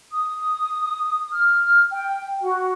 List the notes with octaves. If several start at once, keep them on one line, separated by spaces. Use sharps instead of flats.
D#6
F6
G5
F#4